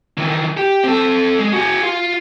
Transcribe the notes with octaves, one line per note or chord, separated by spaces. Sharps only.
D#3 E3
G4
C4 A4
G#3
F#4 G#4
F4